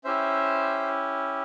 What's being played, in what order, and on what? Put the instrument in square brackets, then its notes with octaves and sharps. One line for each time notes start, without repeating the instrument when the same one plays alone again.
[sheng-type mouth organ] C#4 E4 G4 C5 E5